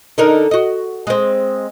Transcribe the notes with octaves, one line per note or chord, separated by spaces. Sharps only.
D3 D#4 A#4
F#4 D#5
G#3 C4